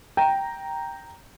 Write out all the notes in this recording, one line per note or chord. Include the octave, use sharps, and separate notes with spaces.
G5 A#5